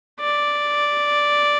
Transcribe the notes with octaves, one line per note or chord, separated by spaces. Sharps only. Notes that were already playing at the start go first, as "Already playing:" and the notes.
D5